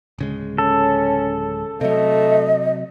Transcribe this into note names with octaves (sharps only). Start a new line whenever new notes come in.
D1 C#3 G#3
C#4 A4
C3 F#3 A3 D#5